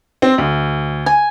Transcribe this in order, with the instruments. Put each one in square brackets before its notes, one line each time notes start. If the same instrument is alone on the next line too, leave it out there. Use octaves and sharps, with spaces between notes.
[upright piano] C4
D2
[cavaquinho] G#5